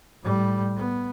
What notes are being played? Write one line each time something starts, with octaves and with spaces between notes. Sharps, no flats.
A2 G3
B3